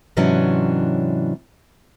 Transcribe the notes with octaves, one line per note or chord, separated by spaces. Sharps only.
G#2 C3 E3 F#3 C#4 D4